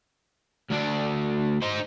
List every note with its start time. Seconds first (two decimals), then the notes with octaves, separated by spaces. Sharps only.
0.70 D2 D4
1.62 D#4 C5